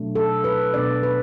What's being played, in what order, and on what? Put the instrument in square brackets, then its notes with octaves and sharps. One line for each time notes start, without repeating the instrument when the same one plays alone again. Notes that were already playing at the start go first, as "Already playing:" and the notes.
Already playing: [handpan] B2 F#3 A3 D4
A4
B4
B2 B3 D4 D5
B4